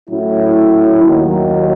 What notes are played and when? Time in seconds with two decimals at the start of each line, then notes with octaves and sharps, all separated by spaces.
0.09 A2 F#3 C#4 E4
1.02 D#2 D#3 F#3